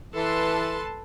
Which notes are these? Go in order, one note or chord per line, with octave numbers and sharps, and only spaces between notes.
E3 A4 B4 A5 C6